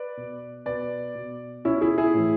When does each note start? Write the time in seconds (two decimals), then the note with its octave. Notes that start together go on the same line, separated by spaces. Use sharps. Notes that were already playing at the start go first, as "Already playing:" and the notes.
Already playing: B4 D5
0.17 B2
0.66 B2 B4 D5
1.15 B2
1.64 B2 C#4 E4
1.81 E4 G#4
1.98 E4 G#4
2.14 A2 E3